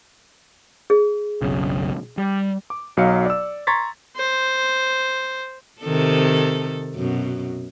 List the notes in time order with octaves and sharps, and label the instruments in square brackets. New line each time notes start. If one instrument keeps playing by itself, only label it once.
[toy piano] G#4
[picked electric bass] F#1 B1 C#3
G3
[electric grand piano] D6
B1 F#3 D#5 F5 C#7
D5 E6
A#5 C6 C#6 G#6 A6 B6
[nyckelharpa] C5
[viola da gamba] C3 D#3 A4
F#2 B2